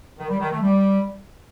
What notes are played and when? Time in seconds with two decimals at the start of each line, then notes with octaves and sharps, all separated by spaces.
0.18 D#3
0.29 G3
0.40 D#3
0.51 A3
0.61 G3